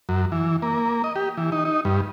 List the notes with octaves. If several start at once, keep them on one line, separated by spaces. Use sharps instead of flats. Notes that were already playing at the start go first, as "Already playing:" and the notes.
F#2
E3
A#3
D#5
G4
E3
D#4
D#4
G2